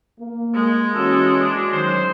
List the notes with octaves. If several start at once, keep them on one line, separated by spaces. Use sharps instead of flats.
A#3
G#3
E3 C#4 F#4 A4
D4
D#3 F#3 C5